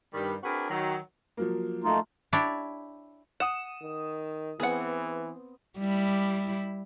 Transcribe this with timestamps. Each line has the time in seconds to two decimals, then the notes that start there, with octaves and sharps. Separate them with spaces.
0.14 G2 D#3 G3
0.43 C4 D4 F#4 G#4 A#4 B4
0.70 D#3 F#3
1.37 F3 F#3 A#3
1.84 A3 D#4 F4
2.33 D4 E4 G4 C#5 D5
3.40 F#5 D#6 E7
3.82 D#3
4.60 E3 B3 C4 G#4 F#5
5.78 G3 E4